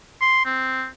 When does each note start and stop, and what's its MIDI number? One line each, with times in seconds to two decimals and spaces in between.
0.21 0.44 84
0.45 0.87 60